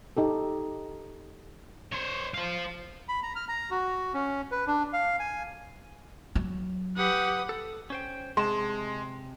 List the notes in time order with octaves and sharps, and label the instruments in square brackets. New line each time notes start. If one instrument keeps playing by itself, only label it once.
[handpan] D#4 G4 A4
[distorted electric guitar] C5 C#5
C5 F5
[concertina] B5
A#5
F6
A#5
F#4
C#4
B4
D4
F5
G#5
[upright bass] F#3
[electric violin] G4 F#5 [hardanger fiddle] B4 D#6
[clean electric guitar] A4
C#4 C5 G5
[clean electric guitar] C3 A5 [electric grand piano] G#3 [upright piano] C6